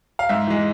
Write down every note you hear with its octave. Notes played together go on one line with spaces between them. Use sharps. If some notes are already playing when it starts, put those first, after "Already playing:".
F5
G#2 E5
E3 G#3